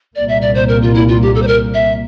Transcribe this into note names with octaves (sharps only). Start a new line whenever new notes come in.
C2 A#2 G3 A#3 D5
E5
D5
C5
A#4
F4
E4
F4
G4
A4
C5
A#4
E5